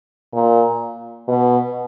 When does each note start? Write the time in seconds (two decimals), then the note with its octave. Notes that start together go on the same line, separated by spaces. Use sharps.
0.33 A#2
1.28 B2